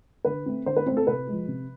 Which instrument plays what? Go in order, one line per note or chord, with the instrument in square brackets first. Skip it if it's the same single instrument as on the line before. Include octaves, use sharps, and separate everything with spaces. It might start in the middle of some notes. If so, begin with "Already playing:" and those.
[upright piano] D3 B4
A3 C4
D3 C5
B4
A3 C4 C5
A4
C3 B4
G#3
F3
C3